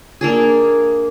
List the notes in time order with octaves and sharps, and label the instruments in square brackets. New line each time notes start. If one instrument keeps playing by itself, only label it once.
[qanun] A#3 D4 G#4